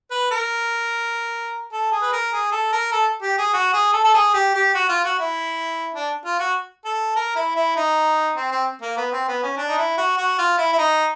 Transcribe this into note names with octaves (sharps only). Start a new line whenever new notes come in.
B4
A#4
A4
G#4
B4
A#4
G#4
A4
A#4
A4
G4
G#4
F#4
G#4
A4
A4
G#4
G4
G4
F#4
F4
F#4
E4
D4
F4
F#4
A4
A#4
E4
E4
D#4
C4
C4
A#3
B3
C4
B3
C#4
D4
D#4
E4
F#4
F#4
F4
E4
E4
D#4